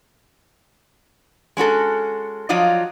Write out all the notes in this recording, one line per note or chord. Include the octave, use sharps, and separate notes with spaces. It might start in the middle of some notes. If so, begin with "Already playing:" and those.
G#3 C#4 F#4 A4
F3 F#3 F4 D5 D#5